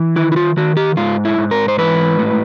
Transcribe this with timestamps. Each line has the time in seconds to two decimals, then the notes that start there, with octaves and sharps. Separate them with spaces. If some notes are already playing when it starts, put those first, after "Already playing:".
Already playing: E3
0.16 D#3 E4
0.32 E4
0.36 F4
0.57 D#3 F#4
0.77 G4
0.97 G#2 F4
1.25 E4
1.38 G#2
1.51 A#4
1.68 C5
1.78 E3 B4
2.19 A2